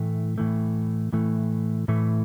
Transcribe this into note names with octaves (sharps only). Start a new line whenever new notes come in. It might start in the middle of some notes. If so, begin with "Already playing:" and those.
Already playing: A2 E3 A3
A2 E3 A3
A2 E3 A3
A2 E3 A3